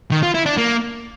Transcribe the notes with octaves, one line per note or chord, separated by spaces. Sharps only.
D#3
F4
E4
D4
A#3